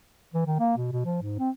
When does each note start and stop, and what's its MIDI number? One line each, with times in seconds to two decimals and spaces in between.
0.34 0.45 52
0.47 0.59 51
0.60 0.76 58
0.77 0.91 47
0.92 1.02 47
1.05 1.22 53
1.22 1.37 44
1.39 1.50 60